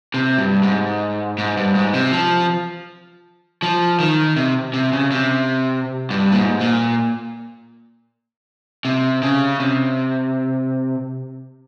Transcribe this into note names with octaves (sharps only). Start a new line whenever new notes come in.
C3
G2
G#2
G#2
G2
G#2
C3
F3
F3
D#3
C3
C3
C#3
C3
G2
A#2
G#2
A#2
C3
C#3
C3